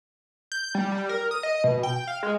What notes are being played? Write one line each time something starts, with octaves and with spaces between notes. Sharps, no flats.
G6
G3
G3
A#4
D#6
D#5
B2
G5
F5
G#3